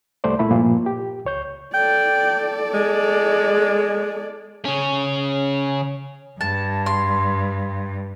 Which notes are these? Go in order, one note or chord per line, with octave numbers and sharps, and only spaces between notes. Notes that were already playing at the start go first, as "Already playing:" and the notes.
C2 G3 A3 C5 D5
A#2 A3 E4 B5
G2 A#2 F3 A#3
G4
C#2 C#5 G6
A4 D5 G5
G#3
C#3 C#4
G2 A5
C6